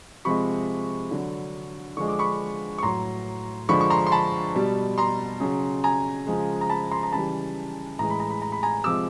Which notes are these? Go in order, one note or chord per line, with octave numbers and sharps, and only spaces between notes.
C3 F3 G#3 B5 C#6
D3 F#3
D3 F3 G#3 C#6
D6
B5 C#6
C#6
A2 F#3 A#5 C6
D3 F3 G#3 B5 C#6
C#6
A#5 C6
C6
A5 B5
B2 G3
A#5 C6
C#3 F#3
G#5 A#5
C#3 F3 G#3
A#5
A5 B5
A#5 C6
A#5
C#3 E3 G3 A5 B5
A2 E3 G#3 A#5
B5
A#5
B5
A#5
B5
G#5 A#5
C3 F3 G#3 D6 E6